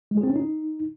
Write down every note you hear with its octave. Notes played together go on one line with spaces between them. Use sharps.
G#3
G#4
C4
C#4
D#4